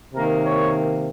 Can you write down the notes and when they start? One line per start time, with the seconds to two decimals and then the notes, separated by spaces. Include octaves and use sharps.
0.14 C3 D#3 A#3 A#4
0.44 C#5